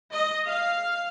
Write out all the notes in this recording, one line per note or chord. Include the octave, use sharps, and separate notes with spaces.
D#5
F5